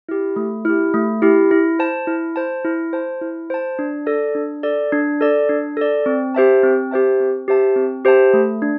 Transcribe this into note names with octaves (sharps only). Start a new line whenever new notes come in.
E4 G4
A3
E4 G4
A3
E4 G4
E4
C5 A5
E4
C5 A5
E4
C5 A5
E4
C5 A5
D4
A4 D5
D4
A4 D5
D4
A4 D5
D4
A4 D5
C4
G4 C5 E5 A5
C4
G4 C5 E5 A5
C4
G4 C5 E5 A5
C4
G4 C5 E5 A5
A3
D4